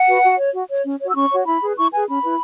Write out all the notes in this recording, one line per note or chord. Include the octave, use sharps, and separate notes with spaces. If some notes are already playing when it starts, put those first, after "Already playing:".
Already playing: F#5
F#4 B4
F#4
C#5
F#4
C#5
C#4
F#4 C#5
E6
C#4 C#6
F#4 C#5
E4 B5
G#4 B4
E4 C#6
G#4 B4 G#5
C#4 B5
E4 B4